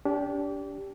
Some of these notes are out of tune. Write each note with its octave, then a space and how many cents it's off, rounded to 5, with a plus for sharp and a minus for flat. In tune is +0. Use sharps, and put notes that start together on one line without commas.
D4 -30 G4 +0